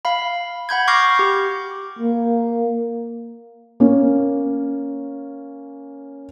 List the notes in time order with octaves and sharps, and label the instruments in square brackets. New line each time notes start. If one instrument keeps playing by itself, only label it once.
[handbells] F5 B5
F#5 B5 G6 G#6
C#6 D6 F6 G6 A#6 C7
G4
[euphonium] A#3
[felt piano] A#3 C#4